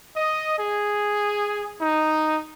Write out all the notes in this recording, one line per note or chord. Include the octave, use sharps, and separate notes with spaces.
D#5
G#4
D#4